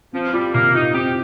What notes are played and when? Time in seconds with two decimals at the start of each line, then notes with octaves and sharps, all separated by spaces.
0.13 F3 C4
0.33 G3 F4
0.54 C3 A#3
0.74 D#4 F4
0.94 C4 G4